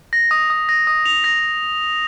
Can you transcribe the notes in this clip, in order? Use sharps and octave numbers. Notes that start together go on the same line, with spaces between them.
A#6
D#6
D#6
A#6
D#6
F7
A#6